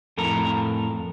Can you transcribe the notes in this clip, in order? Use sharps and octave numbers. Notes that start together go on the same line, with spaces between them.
F2 A2 A4 A#4 A#5